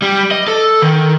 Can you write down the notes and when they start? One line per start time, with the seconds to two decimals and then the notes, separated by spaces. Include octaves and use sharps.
0.02 G3
0.31 D#5
0.48 A4
0.82 D#3